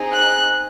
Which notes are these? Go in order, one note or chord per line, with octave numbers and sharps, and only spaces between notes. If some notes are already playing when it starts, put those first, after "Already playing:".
Already playing: C4 D#4 G#4
F#6